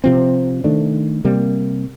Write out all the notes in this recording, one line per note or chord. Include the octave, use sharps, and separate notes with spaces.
C3 F3 C4
D#3 A3 D4
C3 G3 A#3